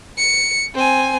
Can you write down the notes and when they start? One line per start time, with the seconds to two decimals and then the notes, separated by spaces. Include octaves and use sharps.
0.18 C#7
0.75 C4 G#5